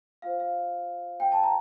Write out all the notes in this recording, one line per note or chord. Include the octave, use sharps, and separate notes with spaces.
F4 C5 F5
F5
G5
A5
A#5